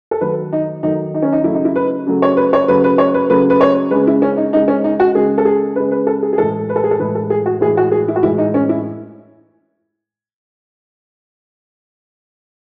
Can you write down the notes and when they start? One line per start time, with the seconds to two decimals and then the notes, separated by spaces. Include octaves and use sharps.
0.11 A4
0.21 D#3 F#3 A3 B4
0.53 D#4
0.83 D#3 F#3 A3 D#4
1.14 D#4
1.22 C#4
1.32 D#4
1.44 C#3 F#3 A3 E4
1.55 D#4
1.65 E4
1.76 B4
2.07 C#3 F#3 A3
2.22 C#5
2.37 B4
2.53 C#5
2.68 C#3 F#3 A3 B4
2.84 B4
2.98 C#5
3.14 B4
3.30 C#3 F#3 A3 B4
3.50 B4
3.61 C#5
3.91 C#3 G#3 B4
4.07 E4
4.22 C#4
4.37 D#4
4.53 C#3 G#3 D#4
4.68 C#4
4.84 D#4
5.00 F#4
5.15 C#3 G#3 G#4
5.38 A4
5.45 G#4
5.76 C#3 G#3 B4
5.91 B4
6.07 A4
6.23 G#4
6.33 G#4
6.38 A2 E3 G#3 A4
6.69 B4
6.76 A4
6.84 G#4
6.91 A4
6.99 A2 E3 G#3 B4
7.15 A4
7.30 G#4
7.46 F#4
7.61 A2 E3 G#3 G#4
7.77 F#4
7.92 G#4
8.08 E4
8.16 F#4
8.23 A2 E3 G#3 E4
8.38 D#4
8.54 C#4
8.69 E4